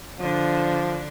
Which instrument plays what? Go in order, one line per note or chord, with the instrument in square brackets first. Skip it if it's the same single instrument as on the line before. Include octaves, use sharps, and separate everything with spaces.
[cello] D3 D4 [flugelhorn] F3